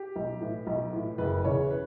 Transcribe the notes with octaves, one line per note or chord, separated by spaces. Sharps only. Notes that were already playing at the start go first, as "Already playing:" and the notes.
Already playing: G4
B1
A2 E3
B1
A2 E3
F#1 B4
E2 C#3 E3 C#5
B4